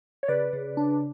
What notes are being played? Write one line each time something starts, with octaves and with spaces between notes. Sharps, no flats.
C#5
C#3 B4 D5
C#3
D4